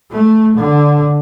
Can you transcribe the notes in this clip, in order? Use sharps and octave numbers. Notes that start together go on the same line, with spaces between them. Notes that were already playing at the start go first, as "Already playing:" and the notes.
A3
D3